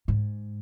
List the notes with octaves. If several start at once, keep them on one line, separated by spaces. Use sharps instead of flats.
G#2